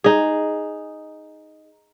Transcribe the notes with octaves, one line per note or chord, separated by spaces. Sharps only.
D#4 G#4